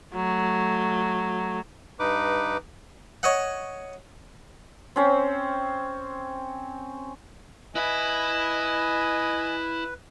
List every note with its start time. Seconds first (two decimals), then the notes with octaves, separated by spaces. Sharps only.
0.15 F#3 A3
1.99 G2 D#4 B4 D6
3.23 C#5 D#5 F#5
4.96 C4 C#4 C5
7.75 E4 B4 D#5 E5 G#5